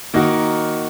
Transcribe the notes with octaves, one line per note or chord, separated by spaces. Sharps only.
D#3 A#3 D#4 F#4